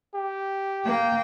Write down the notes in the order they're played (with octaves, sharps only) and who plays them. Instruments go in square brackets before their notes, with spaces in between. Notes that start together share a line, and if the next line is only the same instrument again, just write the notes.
[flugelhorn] G4
[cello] A#3 G5